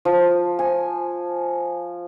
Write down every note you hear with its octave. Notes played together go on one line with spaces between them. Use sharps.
F3
G#5